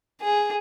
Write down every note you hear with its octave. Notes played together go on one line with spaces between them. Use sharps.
G#4